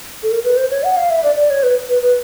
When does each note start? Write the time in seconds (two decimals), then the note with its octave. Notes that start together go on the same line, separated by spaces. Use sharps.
0.23 A4
0.31 A#4
0.44 B4
0.57 C5
0.71 C#5
0.84 F#5
0.97 F5
1.10 E5
1.23 D5
1.36 D5
1.50 C#5
1.63 B4
1.89 B4
2.02 B4